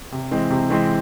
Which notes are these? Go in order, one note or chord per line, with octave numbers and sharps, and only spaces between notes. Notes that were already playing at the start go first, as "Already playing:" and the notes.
C3
E3 G#3 C4
C3
E3 G#3 C4